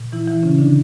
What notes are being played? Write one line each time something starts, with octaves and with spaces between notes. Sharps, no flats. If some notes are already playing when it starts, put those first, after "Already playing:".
Already playing: A#2
E3 E4
E3 E4
C#3 C#4
D3 D4